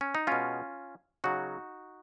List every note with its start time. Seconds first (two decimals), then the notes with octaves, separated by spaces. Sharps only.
0.01 C#4
0.15 D#4
0.27 B2 G#3 C#4 F4
1.24 C#3 F#3 D#4 F#4